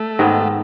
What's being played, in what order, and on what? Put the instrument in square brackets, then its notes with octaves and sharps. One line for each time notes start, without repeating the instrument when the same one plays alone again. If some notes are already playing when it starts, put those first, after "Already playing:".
Already playing: [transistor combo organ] A3
[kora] G#2 D#3 G#3 B3